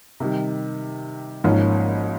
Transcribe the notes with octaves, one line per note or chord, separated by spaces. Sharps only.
C3 D#3 G3
G#1 G#2 F3 A#3 C#4